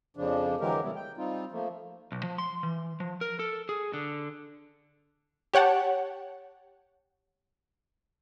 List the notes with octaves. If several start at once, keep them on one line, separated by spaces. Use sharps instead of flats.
F2 C#3 F3 D4
D3 E3 F#3 G#3 G4 A#4
A2 C#3 G3 B3 E4
G5
G3 C4 D#4 F4
F3 A3 A#3
B1
F3
C6
E3
F3
A#4
A4
G#4
D3
G4 C#5 F#5 G5 A5